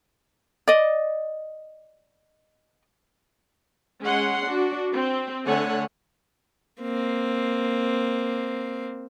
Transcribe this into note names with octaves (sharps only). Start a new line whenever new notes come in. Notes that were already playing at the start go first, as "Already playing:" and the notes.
D5 D#5
G#3 C#4 F#5 C6
D4 F#4
C4
D3 A3 C#5 F#5 G#5
A#3 C4